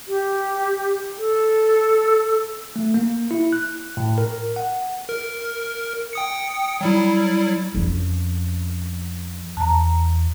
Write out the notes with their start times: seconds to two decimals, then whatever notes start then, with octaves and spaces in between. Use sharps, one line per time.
0.08 G4
1.18 A4
2.76 A3
2.94 A#3
3.31 E4
3.53 F#6
3.97 A2
4.18 A#4
4.56 F#5
5.09 A#4
6.13 G5 D#6 C#7
6.81 F#3 G3 E4
7.75 F2 C#4
9.57 E2 A5 A#5